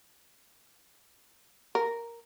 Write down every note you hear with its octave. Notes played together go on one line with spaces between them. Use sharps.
A#4